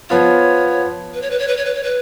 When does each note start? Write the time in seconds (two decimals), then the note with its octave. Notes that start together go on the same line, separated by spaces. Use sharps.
0.10 F3 B3 F4 C#5
1.14 B4
1.22 C#5
1.31 B4
1.39 C#5
1.48 B4
1.57 C#5
1.65 B4
1.75 C#5
1.84 B4